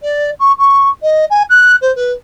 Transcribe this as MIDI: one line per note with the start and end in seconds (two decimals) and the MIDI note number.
0.01 0.30 74
0.39 0.52 85
0.58 0.89 85
1.02 1.24 75
1.30 1.42 80
1.49 1.75 90
1.81 1.94 72
1.95 2.11 71